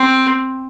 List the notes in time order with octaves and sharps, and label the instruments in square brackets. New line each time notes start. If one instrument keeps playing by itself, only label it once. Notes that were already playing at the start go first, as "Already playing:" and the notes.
Already playing: [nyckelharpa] C4